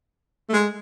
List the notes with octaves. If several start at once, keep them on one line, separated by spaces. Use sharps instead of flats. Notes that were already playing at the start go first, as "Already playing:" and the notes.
A3
G#3